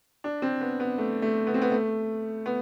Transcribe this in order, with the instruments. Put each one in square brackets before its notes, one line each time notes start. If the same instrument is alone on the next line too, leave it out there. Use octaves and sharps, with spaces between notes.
[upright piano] D4
C4
B3
B3
A3
A3
B3
C4
B3
A3
B3